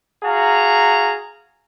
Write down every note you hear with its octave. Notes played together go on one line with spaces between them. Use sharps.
F#4 G#4 F5 A#5